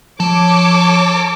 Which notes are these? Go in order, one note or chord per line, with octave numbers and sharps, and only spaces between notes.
F3 A4 C#5 D6